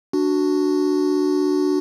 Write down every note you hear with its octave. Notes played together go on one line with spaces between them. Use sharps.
D4 F#4